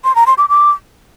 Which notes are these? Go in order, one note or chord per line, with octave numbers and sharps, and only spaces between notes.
C6
A#5
C6
D6
D6